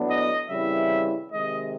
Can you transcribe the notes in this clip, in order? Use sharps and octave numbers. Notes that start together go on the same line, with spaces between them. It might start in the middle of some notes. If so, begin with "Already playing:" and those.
Already playing: A2 F#3 B3 D4
D#5
C#3 E3 G3 C4 E4 E5
C3 D#3 G#3 D#5